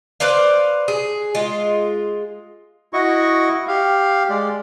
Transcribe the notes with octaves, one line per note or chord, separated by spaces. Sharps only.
B4 C5 D5 F5
G#4
G#3 F4
E4 F#4 D#5 C#6
G4 F5
G#3 D5